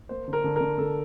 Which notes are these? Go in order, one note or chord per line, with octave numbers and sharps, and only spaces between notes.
A#3 C5
D3
A#4
D3
D3 A#4
D3 A4